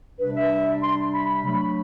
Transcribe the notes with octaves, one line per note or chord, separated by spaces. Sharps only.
C3 G3 D4 B4
E5
C6
B5
B5
F#3 A3 D4 B5
B5